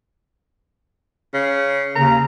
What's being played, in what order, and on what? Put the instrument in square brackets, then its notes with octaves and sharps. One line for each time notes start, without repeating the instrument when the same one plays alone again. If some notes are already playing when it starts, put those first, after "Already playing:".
[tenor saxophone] C#3
[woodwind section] D#2 C#3 [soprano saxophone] A#5